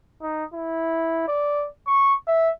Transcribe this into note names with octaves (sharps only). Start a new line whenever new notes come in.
D#4
E4
D5
C#6
E5